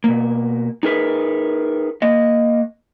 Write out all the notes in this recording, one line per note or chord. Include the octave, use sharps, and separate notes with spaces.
B2 A#3
D#4 G#4 A#4 B4
A#3 D#5